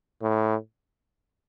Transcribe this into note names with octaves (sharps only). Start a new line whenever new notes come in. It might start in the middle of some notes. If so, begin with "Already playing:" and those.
A2